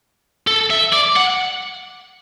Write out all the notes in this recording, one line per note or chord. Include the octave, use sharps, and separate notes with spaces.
A4
E5
D5
F#5